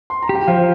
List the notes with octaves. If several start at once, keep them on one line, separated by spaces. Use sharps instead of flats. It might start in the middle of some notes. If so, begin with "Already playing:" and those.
C6
A#5
G4
G5
F3 C5 F5